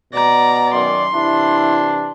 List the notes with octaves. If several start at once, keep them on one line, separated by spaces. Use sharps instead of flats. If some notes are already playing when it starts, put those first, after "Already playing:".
B2 D5 A#5
F#2 D#3 D5 C6
C3 E3 D4 E4